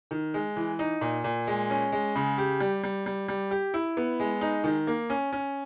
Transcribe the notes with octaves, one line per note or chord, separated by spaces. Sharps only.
D#3
G#3
E3
D#4
A#2
A#2
G#3
C#4
G#3
C#3
G4
G3
G3
G3
G3
G4
E4
B3
G#3
D#4
D#3
A#3
C#4
C#4